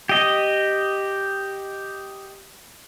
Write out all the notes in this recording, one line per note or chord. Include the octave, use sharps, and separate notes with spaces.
G4 D#5